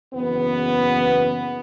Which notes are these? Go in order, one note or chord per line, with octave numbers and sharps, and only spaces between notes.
F#1 E2 B3